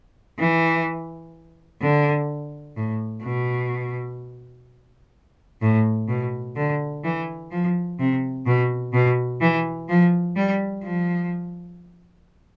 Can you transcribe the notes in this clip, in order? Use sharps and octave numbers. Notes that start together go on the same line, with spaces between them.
E3
D3
A2
B2
A2
B2
D3
E3
F3
C3
B2
B2
E3
F3
G3
F3